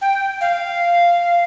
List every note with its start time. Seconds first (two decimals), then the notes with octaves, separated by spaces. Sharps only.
0.01 G5
0.41 F5